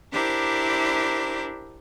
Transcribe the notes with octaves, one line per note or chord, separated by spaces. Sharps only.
D4 E4 G4 A#4 C5